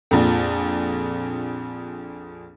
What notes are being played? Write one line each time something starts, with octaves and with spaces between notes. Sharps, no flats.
A#1 F2